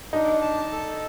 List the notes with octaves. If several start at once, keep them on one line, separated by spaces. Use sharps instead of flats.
D4 D#4
A5
A4